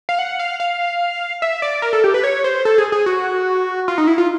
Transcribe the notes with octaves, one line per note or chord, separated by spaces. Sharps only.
F5
F#5
F5
F5
E5
D5
A#4
A4
G4
B4
C#5
C5
A4
G#4
G#4
F#4
F4
D#4
E4
F4